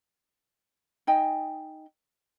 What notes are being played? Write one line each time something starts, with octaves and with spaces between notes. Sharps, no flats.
D#4 D#5 G5 G#5